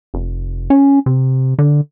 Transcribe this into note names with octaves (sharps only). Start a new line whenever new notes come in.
F1
C#4
C3
D3